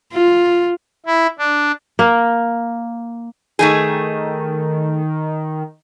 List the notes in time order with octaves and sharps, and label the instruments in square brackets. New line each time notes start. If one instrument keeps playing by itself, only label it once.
[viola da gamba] F4
[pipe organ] E4
D4
[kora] A#3
[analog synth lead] D#3 [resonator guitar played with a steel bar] A3 D#4 G#4